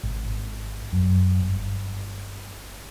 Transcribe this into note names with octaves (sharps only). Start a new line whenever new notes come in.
G#1
F#2
G1